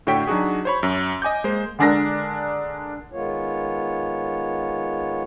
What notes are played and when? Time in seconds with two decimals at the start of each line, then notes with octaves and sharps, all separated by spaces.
0.07 A2 D3 F#4 C#5 G5 B6
0.27 F#3 D4 D#4 F#4 G#4
0.65 C5 C#5 B5
0.83 F#2
1.22 D#5 G#5 D6 G6
1.44 G#3 A#3 C5
1.79 D3 G#3 D4 A#4 A#6
3.12 D#3 G#3 B3 F4 C#5